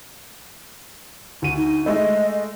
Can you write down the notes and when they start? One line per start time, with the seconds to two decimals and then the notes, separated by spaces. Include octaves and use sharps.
1.42 D2 D#7
1.57 D#4
1.86 G#3 A3 D#5